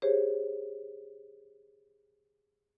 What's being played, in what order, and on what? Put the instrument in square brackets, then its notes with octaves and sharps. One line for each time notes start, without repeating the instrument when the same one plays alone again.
[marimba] G4 G#4 C5 C#5